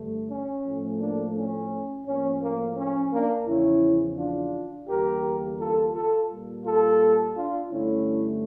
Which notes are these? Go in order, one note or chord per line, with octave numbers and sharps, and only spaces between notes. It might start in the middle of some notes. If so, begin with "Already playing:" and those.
Already playing: G2 D3 A3
C#4
A2 F3 A3
A#3 D4
C#4
A2 F3 A#3 C#4
A#3
C#4
A#3 D4
E2 C#3 F3 C#4 E4
D4 F4
E2 D3 G3 A#3 G4 A#4
F4 A4
F4 A4
A#2 G3 A#3
F4 A4
D4 F4
G2 D3 A3 C#4 E4